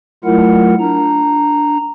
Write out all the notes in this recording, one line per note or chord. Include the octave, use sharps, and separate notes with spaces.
F#3 A3 E4 F4 A#4 F#5
D4 A#5